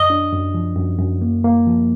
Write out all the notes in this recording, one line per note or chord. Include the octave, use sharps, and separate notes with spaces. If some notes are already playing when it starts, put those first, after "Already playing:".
Already playing: F#2 D#5
D4
F#2
F3
F#2
F#2
A#3
A#3
F3